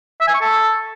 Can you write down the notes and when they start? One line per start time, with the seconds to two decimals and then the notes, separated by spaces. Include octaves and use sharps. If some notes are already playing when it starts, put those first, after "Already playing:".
0.21 E5
0.28 G#5
0.34 C#6
0.41 A4